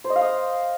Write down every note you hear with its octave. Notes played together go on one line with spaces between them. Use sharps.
C5
D#5
F5
D#6